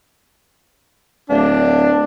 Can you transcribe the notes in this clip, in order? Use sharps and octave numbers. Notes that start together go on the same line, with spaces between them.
D1 D4